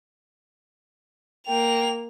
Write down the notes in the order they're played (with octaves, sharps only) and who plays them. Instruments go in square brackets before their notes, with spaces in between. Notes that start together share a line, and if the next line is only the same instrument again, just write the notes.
[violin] A#3 F7 [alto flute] G5